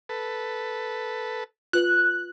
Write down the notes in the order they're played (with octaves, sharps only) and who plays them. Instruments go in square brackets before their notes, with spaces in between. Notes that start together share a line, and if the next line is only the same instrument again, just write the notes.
[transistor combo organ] A4 B4
[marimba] F4 B4 [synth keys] F#6